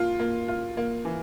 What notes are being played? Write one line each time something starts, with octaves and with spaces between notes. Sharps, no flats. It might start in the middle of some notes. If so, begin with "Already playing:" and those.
Already playing: A#3 F4
A#3
F4
A#3
E3